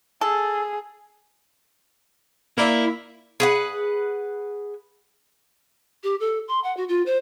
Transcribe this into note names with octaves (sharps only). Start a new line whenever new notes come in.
G#4 A4
A#3 E4 A#4 D5 E5
G#4 B4 F#5
G4
A4
C6
F#5
F#4
F4
C5